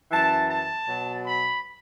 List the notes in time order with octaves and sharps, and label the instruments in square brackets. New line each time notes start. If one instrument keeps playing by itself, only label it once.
[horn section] F#2 E3 A5
A5
B2 F#3
B5